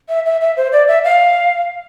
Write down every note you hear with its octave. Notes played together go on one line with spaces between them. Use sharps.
E5
E5
E5
C5
D5
E5
F5